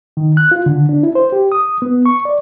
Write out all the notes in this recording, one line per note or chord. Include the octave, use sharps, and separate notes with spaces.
D#3
F#6
F4
D3
D4
E4
C5
G4
D#6
B3
C#6
D5